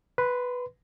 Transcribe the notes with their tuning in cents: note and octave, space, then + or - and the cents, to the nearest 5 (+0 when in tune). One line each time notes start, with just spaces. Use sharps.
B4 +0 C6 -25